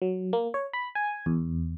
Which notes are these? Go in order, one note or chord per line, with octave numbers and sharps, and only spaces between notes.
F#3
A#3
C#5
B5
G#5
E2